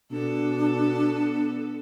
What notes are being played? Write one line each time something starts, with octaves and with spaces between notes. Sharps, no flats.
B2 B3 D4 A4